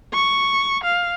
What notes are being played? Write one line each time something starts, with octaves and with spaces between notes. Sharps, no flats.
C#6
F5